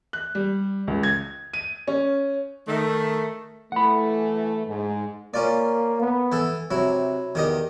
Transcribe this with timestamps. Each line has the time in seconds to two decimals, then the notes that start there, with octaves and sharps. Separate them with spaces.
0.13 F#6
0.35 G3
0.87 C#2
1.03 G#6
1.54 D#7
1.87 C#4
2.67 D#3 A3
3.72 E3 A3 F#5 B5
4.67 G#2
5.34 A#3 C#4 F4 D5
6.02 B3
6.32 E3 A4
6.71 C3 F#3 E4
7.35 E2 D#3 G4 D#5